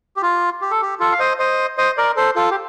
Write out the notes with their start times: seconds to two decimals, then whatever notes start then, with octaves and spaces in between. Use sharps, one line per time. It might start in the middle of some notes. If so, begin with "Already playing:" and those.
0.17 G4
0.22 F4
0.61 G4
0.71 A4
0.82 G4
1.00 F4 A4
1.12 F5
1.19 C5 D#5
1.39 C5 D#5
1.78 C5 D#5
1.97 A#4 D5
2.17 A4 C5
2.36 F4 A4
2.51 G4